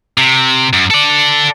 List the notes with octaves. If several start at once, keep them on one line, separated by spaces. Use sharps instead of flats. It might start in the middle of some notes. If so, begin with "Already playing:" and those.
C3
F#2
A4 D5